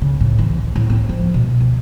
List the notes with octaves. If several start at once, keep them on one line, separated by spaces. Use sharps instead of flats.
C#3
A2
E3
C2
A2
C4
F3
B2
C4